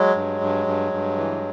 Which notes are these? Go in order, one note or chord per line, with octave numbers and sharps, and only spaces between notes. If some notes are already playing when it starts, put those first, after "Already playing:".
Already playing: F#3 G#3
G2
G2
G2
G2
E3